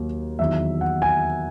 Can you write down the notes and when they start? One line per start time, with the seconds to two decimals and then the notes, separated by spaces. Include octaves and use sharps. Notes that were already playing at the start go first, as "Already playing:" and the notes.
Already playing: D#2 F#3
0.39 E2 D#3 F#3 E5
0.81 F#5
1.02 G#5